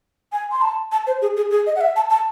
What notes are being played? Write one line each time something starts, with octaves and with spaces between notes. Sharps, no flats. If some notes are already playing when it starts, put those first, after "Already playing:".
G#5
C6
A5
A5
C5
G#4
G#4
G#4
D#5
F#5
E5
A5
A5